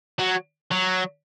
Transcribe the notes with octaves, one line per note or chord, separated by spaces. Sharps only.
F#3
F#3